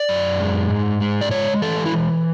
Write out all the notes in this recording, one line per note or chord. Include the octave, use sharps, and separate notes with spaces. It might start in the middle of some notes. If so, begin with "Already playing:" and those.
Already playing: D5
F#2
G#3
G#2
G#3
D5
G#3 C#5
E3 A4
E4